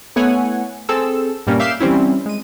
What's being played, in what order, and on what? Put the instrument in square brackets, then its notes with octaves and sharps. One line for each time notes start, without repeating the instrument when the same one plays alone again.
[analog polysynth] A3 B3 E4 C#5 F#5 G#5
C4 G#4 A4 E6
G2 A#2 G3 A#3 C#4
E5 F5 D6 G6 C7 E7
E3 G3 C4 C#4 E4
G#3 D#7